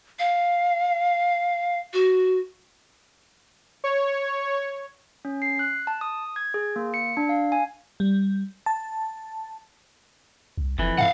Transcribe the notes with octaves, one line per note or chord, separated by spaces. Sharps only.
F5
F#4
C#5
C#4
C7
F#6
A5
D#6
G#6
G#4
A#3
C#7
D4
F5
G#5
G3
A5
C2
F1 F2 E3
G#2 F5 F#5